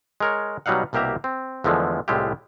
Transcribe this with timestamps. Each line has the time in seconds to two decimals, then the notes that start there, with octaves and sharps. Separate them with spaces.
0.20 G#3 A#4 C#5
0.66 B2 F#3 G3 D#4 F5 F#5
0.93 C2 B2 A#3 G4 E5 A#5
1.24 C4
1.64 E2 D3 F3 G#3 A3
2.08 C2 A2 G#3 E4 F4 G4